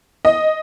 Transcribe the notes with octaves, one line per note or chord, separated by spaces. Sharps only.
D#5